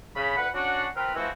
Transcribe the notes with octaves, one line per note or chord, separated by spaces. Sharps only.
C#3 B5
D2 B4 F#5
C#4 D4 F#4 F#5
C4 F4 A#4 B4
E3 F3 G#3 C4 E4 F#4